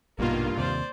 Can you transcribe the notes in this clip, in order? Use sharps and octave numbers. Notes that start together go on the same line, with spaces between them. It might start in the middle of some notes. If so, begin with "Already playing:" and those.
A#1 G2 B2 D#3 A#3 F4
D#2 C3 C5 D5